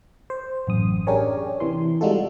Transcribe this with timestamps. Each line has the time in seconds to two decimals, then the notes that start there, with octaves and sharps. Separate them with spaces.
0.30 C5
0.67 A1 F#2 D#6
1.07 C#4 D4 G4 G#4 A#4 C#5
1.60 C3 E3 C6
2.01 G3 G#3 D#4 F4 F#4 A4